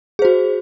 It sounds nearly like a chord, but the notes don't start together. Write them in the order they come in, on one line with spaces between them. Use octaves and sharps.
G#4 C5 F#4